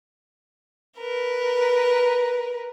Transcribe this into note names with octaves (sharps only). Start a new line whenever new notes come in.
A#4 B4